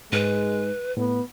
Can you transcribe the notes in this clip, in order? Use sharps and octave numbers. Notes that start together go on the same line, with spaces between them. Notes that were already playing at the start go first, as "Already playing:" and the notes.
G#2 G#3 B4
A2 B3